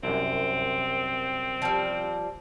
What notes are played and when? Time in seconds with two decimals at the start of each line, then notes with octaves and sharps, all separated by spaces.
0.03 C2 F#2 C4
1.62 F3 G3